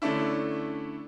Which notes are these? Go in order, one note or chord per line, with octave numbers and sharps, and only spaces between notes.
D3 A3 C#4 D4 E4